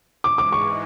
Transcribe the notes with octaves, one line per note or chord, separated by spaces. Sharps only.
G#2 E3 G#3 D6
D6
C#6